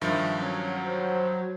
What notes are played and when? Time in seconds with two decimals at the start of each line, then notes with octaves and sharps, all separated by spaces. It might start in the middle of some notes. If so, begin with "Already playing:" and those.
0.01 G2 D#3 F3 E5
0.37 F#3 C#4
0.84 C5